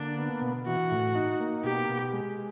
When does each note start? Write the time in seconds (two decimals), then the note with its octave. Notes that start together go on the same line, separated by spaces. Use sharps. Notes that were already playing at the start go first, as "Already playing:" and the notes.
Already playing: D3 A#3 D4
0.18 B3
0.41 B2
0.67 E3 F#4
0.91 A2
1.15 D#4
1.40 A#3
1.64 B2 G4
1.89 B2
2.13 G#3